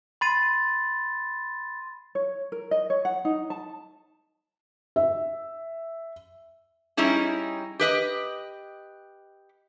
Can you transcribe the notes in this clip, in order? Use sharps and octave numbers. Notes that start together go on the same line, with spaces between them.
B5 C6 A6 C7 D#7
C#5
A#4
D#5
C#5
F#5
D#4
A5
E5
G3 C#4 D#4 E4 G#4
G4 B4 D#5